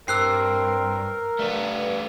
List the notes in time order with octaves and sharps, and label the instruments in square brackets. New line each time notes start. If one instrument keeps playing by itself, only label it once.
[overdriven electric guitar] G2 [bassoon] C4 [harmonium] A#4 [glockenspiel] E6 F#6 C7
[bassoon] G2 [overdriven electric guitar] A3 B3